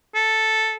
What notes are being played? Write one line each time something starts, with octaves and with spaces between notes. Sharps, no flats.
A4